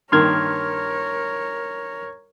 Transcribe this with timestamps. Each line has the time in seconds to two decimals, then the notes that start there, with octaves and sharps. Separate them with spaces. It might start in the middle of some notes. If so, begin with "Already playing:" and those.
0.12 G2 D#3 A#3 A#4 C#5 C6 F6 G#6